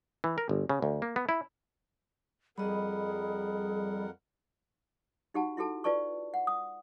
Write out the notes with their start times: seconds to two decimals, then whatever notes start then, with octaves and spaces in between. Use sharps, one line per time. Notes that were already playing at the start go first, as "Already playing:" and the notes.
0.24 E3
0.38 A#4
0.49 G1
0.69 C#3
0.82 D2
1.02 A#3
1.16 B3
1.29 E4
2.58 F2 G3 G#4 A#4 D#5 F#5 B5
5.34 D#4 F#4 G4 F#5 A5
5.57 E4 F#4 G4 A4 A5
5.84 F4 B4 D5 A5 C#6
6.34 F#5
6.47 D#6